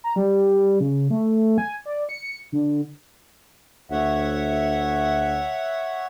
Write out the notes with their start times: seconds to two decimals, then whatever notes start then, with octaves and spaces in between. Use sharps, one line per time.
0.04 A#5
0.16 G3
0.80 C#3
1.10 A3
1.58 G#5
1.86 D5
2.09 C#7
2.52 D3
3.91 D2 C#5 E5 F#5